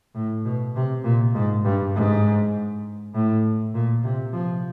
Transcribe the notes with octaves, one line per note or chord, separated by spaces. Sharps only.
A2
B2
C3
A#2
G#2
G2
G#2
A2
A#2
C3
F3